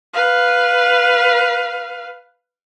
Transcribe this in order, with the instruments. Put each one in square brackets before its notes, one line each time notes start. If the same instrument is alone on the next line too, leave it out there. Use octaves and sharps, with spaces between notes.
[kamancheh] B4 F5